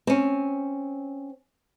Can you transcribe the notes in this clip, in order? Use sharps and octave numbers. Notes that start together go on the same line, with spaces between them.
C4 C#4